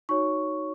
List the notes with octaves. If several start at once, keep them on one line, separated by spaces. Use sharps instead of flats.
D#4 F#4 C#5 C#6